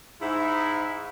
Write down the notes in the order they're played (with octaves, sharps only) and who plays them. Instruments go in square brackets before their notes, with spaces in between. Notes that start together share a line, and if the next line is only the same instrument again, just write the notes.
[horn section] G#2 E4